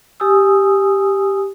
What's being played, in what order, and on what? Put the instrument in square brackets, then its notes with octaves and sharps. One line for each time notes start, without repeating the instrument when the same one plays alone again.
[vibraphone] G4 G#5 D#6 E6